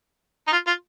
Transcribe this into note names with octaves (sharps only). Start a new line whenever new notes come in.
D#4
F4
F4